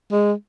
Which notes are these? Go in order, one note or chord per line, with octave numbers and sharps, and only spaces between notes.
G#3